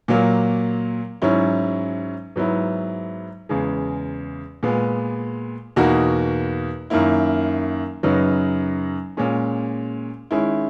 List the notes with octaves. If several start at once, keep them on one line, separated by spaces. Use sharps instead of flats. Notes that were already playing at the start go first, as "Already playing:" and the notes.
A#2 F#3 A#3
G#2 F#3 C#4 E4
G#2 F#3 B3 E4
E2 C#3 G#3
A#2 G#3 B3
E2 B2 A#3 D#4 F#4
F#2 D#3 A#3 E4
F#2 C#3 F#3 B3 D#4
A#2 G#3 C#4
D#3 G#3 C#4 E4